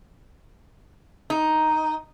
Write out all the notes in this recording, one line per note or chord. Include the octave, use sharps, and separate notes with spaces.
D#4